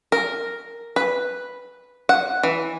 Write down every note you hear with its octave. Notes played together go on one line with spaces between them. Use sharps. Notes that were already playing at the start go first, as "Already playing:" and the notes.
A#4
B4
F#5
E3